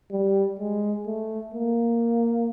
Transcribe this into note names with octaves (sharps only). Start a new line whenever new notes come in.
G3
G#3
A3
A#3